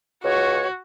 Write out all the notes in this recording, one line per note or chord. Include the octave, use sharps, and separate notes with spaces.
C#2 F#4 C#5